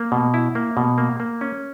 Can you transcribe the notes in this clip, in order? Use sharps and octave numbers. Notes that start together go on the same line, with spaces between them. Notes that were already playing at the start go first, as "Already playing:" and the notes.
Already playing: A#3
B2
E4
A#3
B2
A#3
A#3
C#4